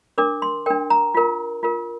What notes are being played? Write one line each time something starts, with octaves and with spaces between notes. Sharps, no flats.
D4 A#4 D6
C6
D4 A#4 G5
A#5
F4 A#4
F4 A#4